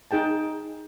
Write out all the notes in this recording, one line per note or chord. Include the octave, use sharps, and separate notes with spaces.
D#4 G#4 G5 A5